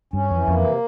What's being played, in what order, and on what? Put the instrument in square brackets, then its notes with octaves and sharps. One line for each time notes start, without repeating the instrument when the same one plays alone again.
[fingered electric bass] G2 [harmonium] C#4
[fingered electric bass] F2 [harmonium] E3
[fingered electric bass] F2 [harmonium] A#3
[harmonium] C3